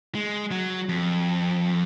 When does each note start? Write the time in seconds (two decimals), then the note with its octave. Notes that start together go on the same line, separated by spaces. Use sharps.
0.15 G#3
0.51 F#3
0.89 F2